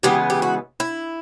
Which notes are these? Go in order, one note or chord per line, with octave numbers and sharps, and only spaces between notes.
C#3 E3 G#3 B3 G4
G4
F#4
E4